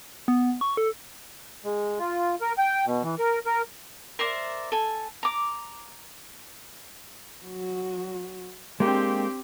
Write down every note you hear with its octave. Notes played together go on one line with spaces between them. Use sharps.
B3
C#6
A4
G#3
F4
A#4
G5
B2
E3
A#4
A#4
A#4 C5 D5 E5
A4 G#5
A#5 D6
F#3 F#4
G#3 A#3 C4 D4 G4